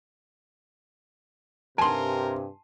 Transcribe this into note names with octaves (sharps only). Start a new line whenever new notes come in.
G2 C3 A#4 G#5 A5 C6